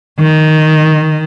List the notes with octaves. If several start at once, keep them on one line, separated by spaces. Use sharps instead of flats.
D#3